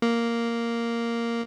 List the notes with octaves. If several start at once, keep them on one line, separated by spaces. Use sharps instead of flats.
A#3